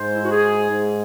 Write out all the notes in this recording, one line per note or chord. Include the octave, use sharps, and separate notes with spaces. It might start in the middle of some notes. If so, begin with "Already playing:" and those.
Already playing: G#2 C5
E4
F#4
G#4
G#2